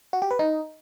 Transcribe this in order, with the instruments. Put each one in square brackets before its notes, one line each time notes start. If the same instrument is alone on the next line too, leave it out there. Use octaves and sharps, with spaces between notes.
[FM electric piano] F#4
G4
B4
D#4